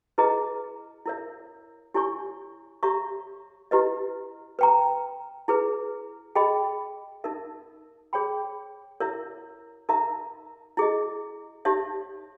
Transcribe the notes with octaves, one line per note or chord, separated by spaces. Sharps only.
E4 G#4 B4 D#5 A#5
E4 A#4 C#5 E5
E4 G4 C#5 G#5 C#6
G4 C#5 E5 A#5 C#6
E4 G4 B4 D#5
B4 G5 A#5
E4 G#4 B4
G#4 D#5 G5 B5
D#4 A#4 E5
G#4 C#5 G5 B5
E4 A#4 C#5 E5
D#4 A#4 E5 A#5
E4 G#4 D#5
D#4 G4 C#5 E5